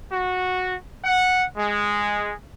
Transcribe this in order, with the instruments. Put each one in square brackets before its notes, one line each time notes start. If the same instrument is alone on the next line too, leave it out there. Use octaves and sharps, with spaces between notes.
[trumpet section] F#4
F#5
G#3